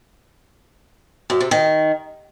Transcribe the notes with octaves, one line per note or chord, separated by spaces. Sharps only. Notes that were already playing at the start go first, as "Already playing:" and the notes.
F#2
C3
D#3